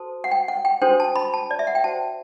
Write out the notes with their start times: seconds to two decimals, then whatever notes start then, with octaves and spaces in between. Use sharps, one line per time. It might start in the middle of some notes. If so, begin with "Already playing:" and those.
Already playing: F#4 A4 C5 A5
0.24 F#5
0.31 G5
0.48 F#5
0.65 G5
0.82 D4 F#4 A4 C5 G5
1.00 A5
1.16 B5
1.34 A5
1.51 D5
1.59 E5
1.67 F#5
1.75 G5
1.84 F#4 C5 A5